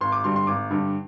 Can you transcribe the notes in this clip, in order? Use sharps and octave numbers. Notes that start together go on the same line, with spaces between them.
G#1 C6
D6
G2 D3 G3 C6
C6
G#1 D6
G2 D3 G3